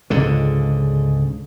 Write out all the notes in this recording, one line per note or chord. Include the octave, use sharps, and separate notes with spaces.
C#2 G#2 D3